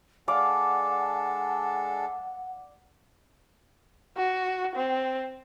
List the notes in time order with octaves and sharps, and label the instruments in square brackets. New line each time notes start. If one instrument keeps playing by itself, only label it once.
[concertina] G#3 D4 A4 [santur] D5 F5 D6 [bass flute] F#5
[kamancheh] F#4
C4